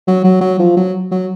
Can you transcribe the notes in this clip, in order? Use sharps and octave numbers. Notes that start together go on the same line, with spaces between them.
F#3
F#3
F#3
F3
F#3
F#3